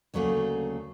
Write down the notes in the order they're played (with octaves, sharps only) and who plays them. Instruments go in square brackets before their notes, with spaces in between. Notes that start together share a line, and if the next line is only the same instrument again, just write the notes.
[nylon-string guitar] D2 C#3 F#3 A3 A#3 G#4